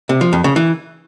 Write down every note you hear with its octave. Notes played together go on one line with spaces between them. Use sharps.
C3
F3
F2
C#3
E3